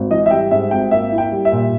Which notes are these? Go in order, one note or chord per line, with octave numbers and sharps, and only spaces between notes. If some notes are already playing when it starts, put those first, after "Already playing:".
Already playing: G#1
E3 D#5
E5
G3 G5
G#2 E5
G#1 G5
A#3 E5
E4
G5
G3
E5
A#2